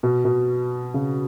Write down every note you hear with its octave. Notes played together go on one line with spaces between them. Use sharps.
B2
B2
C#3